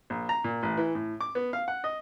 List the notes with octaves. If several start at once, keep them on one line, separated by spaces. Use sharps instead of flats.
A#1
A#5
A#2
A1
E3
A2
D6
B3
F5
F#5
D#5